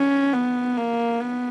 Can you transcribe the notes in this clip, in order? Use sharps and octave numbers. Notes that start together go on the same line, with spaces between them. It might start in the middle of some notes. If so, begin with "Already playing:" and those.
Already playing: C#4
B3
A#3
B3